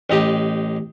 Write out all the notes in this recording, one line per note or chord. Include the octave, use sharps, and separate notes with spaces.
A1 D#4 G4